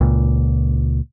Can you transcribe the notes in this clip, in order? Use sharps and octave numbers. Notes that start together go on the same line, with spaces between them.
C#2 A#2